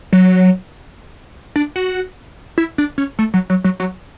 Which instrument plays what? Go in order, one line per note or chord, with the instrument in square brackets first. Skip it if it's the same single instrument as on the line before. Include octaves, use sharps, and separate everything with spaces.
[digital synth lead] F#3
D4
F#4
E4
D4
C#4
A3
F#3
F#3
F#3
F#3